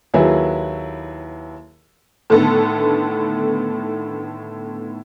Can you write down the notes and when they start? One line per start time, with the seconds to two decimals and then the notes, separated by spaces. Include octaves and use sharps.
0.14 D#2 F#3 E4 G#4 B4
2.30 A2 D3 D#3 B3 A4